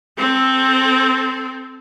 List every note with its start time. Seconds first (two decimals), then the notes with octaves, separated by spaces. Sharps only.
0.18 C4 A4